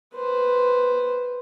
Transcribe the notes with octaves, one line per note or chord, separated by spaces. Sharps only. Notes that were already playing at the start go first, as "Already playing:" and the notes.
B4 C5